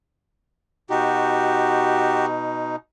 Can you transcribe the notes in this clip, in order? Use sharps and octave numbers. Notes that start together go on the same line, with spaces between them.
B2 D#4 F#4 G4